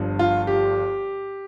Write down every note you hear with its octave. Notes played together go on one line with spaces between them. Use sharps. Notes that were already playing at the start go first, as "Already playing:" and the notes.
Already playing: G1 G2 F3
F4
G4